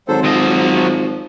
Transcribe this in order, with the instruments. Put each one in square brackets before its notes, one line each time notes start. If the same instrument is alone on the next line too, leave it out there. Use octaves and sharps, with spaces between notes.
[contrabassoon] G#1 [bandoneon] F#3 A4 C5
[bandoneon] F3 [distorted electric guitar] F#3 D#5